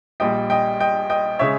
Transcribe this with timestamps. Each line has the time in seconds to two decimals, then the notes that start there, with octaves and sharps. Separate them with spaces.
0.20 A#1 A#2 G3 D#5 G5
0.50 D#5 G5
0.80 D#5 G5
1.10 D#5 G5
1.39 C#3 G#3 C#5 E5